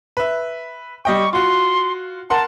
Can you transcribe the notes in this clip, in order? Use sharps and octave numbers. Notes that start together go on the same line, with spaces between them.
B4 E5
G3 D#5 G5 C#6
F4 F#4 C6
A#4 F#5 A5 C6